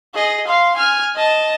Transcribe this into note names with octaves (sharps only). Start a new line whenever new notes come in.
G#4 D#5
F5 C6
G#5 F6
D#5 A5